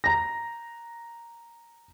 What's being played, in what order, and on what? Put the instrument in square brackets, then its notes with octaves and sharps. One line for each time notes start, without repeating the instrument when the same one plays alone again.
[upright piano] A#5 A#6